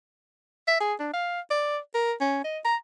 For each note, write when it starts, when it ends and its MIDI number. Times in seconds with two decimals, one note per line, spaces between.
0.68 0.76 76
0.80 0.94 68
1.00 1.10 62
1.14 1.40 77
1.51 1.78 74
1.94 2.13 70
2.21 2.40 61
2.44 2.59 75
2.65 2.76 82